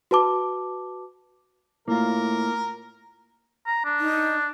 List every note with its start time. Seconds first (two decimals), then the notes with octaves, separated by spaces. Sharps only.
0.11 F#4 B4 A5 D6
1.88 A2 A#3 F4 A#4
3.67 A#5
3.85 D4
4.00 D#4